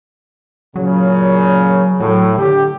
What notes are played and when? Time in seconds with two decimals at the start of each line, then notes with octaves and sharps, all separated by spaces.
0.76 A#2 C#3 F#3
2.00 A2 F#3
2.38 D3 G4